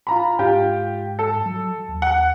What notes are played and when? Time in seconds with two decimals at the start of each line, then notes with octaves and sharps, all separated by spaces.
0.07 F4 A#5 B5
0.39 G#2 F4 G4 G5
1.19 A4
1.46 F#3
1.89 D#2
2.02 F#5